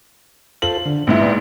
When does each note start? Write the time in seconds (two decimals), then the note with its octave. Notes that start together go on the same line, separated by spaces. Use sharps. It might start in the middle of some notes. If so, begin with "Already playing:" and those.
0.62 F4 A4 C5 F#7
0.85 D3
1.07 A#1 G#2 B3 E4
1.21 D#4 B4 D5